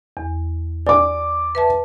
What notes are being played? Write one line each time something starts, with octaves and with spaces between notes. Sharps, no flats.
E2
D5 G#5 D6
B4 E5 A5